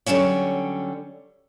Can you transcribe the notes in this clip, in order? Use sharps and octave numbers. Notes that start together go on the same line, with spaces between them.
D3 F#3 G3 C#4 C#5